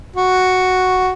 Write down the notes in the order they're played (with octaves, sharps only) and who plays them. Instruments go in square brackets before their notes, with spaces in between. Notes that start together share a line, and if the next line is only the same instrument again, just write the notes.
[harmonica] F#4